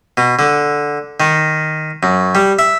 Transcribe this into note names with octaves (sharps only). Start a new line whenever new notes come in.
B2
D3
D#3
F#2
G3
E5